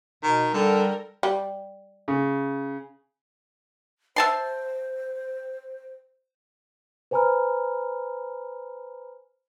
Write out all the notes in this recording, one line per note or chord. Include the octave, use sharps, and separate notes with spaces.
B2 D#3
D3 G3 A4 A#4
G3
C#3
C5 E5 A5 C6
B4 C5 G#5 A#5 B5 F6